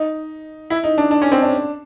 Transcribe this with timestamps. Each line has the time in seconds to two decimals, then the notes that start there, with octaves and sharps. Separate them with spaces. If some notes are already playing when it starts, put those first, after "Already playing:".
Already playing: D#4
0.70 E4
0.83 D#4
0.98 D4
1.11 D4
1.22 C#4
1.32 C4
1.42 D4